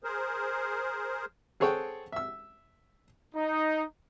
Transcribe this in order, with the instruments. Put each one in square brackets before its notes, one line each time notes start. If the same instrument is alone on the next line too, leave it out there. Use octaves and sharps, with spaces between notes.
[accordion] G#4 A#4 C5
[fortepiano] C4 G#4 A4 C#5 F#5 G5
E5 E6
[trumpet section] D#4